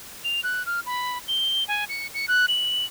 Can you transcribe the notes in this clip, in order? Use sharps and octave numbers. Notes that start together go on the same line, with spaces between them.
F7
F#6
F6
B5
G7
G#5
C#7
C#7
F#6
F#7